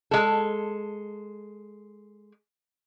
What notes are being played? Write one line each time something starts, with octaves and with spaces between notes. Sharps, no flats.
G#3 A4